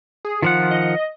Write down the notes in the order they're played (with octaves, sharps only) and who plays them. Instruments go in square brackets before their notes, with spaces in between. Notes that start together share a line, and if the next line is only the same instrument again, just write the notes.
[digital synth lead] G#4
[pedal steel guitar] D#3 F3 F#5 [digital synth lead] F4
[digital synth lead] D#5